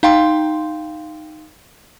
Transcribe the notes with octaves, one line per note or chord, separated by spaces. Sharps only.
D#4 F5 G5 C6